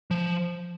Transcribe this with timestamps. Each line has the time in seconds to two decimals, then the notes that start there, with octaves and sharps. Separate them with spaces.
0.11 F3